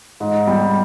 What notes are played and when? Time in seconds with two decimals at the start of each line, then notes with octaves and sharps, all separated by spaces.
0.20 G#2
0.47 G3